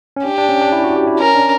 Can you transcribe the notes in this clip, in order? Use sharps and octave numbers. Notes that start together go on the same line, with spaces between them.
C#4
D4 G4
D4
C#4
D4
E4
F#4
G4
E4
C#4 A#4
D4